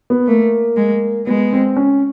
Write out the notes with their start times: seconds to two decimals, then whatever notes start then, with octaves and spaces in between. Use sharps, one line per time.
0.10 B3
0.27 A3 A#3
0.76 G#3
1.27 G#3 B3
1.53 C4
1.76 C#4